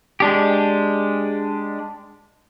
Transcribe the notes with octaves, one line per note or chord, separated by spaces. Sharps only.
G#3 D4 G4